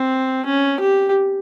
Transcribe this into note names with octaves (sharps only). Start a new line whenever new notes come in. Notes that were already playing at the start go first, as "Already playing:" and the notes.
Already playing: C4
C#4
G4